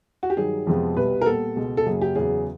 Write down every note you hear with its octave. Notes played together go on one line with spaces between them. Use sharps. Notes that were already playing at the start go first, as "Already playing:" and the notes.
F#4
G4
G2 D#3 F#3 G#4
F2 C3 F3 G#3 B3
C2 B2 G3 B4
A#4
A#2 G3 B3 A4
C#2 B2 G#3
A4
F#2 C#3 F#3 A#3 G#4
G4
E2 C#3 F#3 G#4